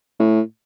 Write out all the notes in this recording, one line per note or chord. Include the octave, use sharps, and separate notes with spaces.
A2